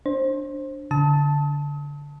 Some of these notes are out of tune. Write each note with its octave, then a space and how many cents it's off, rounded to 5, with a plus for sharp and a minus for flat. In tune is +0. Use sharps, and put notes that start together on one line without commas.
D4 +0 C5 +25
D3 -20 A5 +0 D#6 +40